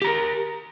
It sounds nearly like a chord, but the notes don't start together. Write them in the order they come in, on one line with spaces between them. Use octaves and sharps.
G4 A#5 A#4